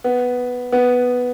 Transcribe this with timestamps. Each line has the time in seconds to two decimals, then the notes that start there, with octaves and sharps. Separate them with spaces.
0.04 B3
0.72 B3